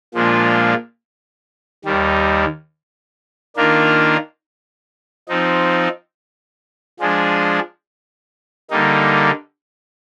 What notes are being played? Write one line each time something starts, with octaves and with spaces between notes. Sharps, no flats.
A#2 F3 G#3 D4 F4
D#2 D#3 G3
D#3 A#3 D4 F4 A#4
F3 C4 D#4
F3 G#3 D4 G#4
D3 G3 A#3 D#4